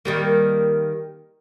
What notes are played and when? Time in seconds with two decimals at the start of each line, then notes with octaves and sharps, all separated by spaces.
0.05 D#3 G3 A#3